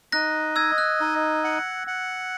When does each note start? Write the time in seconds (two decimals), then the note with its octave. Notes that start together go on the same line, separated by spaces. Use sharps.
0.12 D#4 F#6 A#6
0.56 D#5 E6 G#6
0.78 F#6
1.00 D#4
1.44 F#5
1.87 F#5